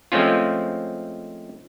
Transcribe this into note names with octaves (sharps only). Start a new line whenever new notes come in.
F3 G#3 A3 C4 C#4 F4